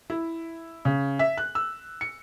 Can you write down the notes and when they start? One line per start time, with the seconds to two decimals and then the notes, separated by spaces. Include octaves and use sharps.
0.10 E4
0.85 C#3
1.19 E5
1.38 F#6
1.55 E6
2.01 C#7